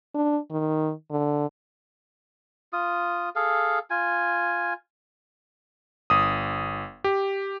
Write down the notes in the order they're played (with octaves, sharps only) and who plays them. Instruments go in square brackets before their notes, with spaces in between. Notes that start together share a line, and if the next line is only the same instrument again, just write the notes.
[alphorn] D4
D#3
D3
[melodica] F4 D#6
G#4 A4 F5
F4 G#5
[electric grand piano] G1 D#6
G4